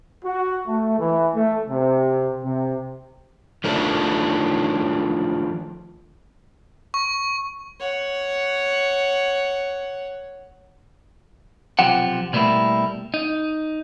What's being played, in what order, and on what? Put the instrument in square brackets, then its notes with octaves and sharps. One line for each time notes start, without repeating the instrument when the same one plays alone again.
[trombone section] F#4
A3
E3
A3
C3
C3
[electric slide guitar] D#3 F3 A3 D4
[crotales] C#6
[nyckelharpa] C#5 F#5
[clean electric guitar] B1 C3 F3 G4 F#5
B2 G3 A3 A#3 E4
D#4